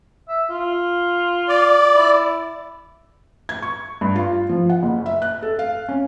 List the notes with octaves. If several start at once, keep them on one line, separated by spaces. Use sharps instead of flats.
E5
F4
D5
E4
G#6
C#6
G2
F4
F3
F#5
F#1
E5
F#6
A4
F5
C#4